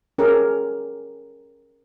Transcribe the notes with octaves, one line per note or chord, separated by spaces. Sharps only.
C#4 G4 G#4 A#4